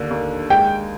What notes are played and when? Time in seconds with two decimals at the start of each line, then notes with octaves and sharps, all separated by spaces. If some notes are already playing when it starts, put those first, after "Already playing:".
Already playing: D#2 D3
0.10 D#2
0.50 G#3 G5